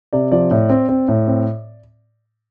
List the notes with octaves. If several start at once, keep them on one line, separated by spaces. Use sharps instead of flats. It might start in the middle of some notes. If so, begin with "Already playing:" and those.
C3 D5
F3 D5
A2
C4
C4
A2
C4